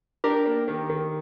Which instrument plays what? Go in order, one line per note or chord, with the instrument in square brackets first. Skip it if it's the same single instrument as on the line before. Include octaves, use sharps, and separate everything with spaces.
[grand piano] D4 [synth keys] G4 A#4
[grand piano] A#3
D#3
D#3